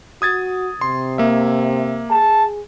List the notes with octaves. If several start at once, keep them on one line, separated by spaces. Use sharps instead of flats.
F#4 D#6 G#6 A6
C3 C6
A#3 E5
G#4 A5